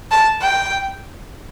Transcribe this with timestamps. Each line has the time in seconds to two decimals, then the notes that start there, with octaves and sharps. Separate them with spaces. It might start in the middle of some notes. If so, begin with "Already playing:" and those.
0.11 A5
0.42 G5